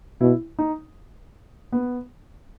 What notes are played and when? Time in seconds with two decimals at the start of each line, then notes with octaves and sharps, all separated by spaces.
0.21 B2 E4
0.59 D#4
1.72 B3